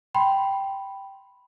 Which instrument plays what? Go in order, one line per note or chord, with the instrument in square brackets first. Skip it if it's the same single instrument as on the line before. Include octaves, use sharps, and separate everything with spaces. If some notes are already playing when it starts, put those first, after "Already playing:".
[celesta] G5 B5 C6